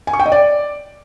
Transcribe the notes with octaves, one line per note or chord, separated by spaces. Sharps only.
G#5
C#6
G5
D#5
D5